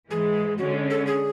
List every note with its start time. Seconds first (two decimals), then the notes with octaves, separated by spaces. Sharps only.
0.10 G#2 E3 G#3 G#4
0.58 D3 G#3 C#4 F#4
0.90 A4
1.07 G#4